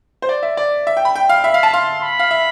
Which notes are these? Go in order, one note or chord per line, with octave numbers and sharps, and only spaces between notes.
C5
D5
E5
D5
E5
G5
B5
G5
F5
E5 B5
F5
A5
F5 C6
B5
F5
E5